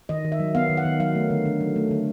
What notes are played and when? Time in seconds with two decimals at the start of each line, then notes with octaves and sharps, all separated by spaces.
0.09 D#3 D#5
0.25 D#3
0.32 E5
0.40 F#3
0.55 B3 F5
0.70 D#3
0.77 F#5
0.85 D#3
1.00 F#3 F5
1.15 A3
1.30 D3
1.46 D3
1.61 F#3
1.76 A3
1.91 D3